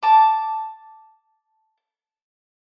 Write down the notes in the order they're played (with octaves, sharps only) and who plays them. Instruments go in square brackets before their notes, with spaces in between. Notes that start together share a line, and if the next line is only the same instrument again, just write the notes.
[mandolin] A5 D6